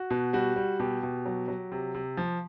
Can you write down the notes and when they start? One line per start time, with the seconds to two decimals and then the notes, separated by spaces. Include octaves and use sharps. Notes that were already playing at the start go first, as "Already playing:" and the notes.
Already playing: F#4
0.10 B2
0.33 G3 F#4
0.56 G3
0.80 B2 G4
1.03 B2
1.26 F#3
1.48 F#3
1.72 C3
1.94 C3
2.17 F3